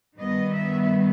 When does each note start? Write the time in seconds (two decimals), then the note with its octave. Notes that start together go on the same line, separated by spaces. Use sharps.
0.18 G2 D#3 G3 B3 D#5
0.54 E5